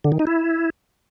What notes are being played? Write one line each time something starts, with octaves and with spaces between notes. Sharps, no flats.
D3
D#3
D#4
E4